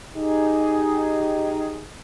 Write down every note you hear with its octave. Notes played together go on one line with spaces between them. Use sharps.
D#4 G4 G#4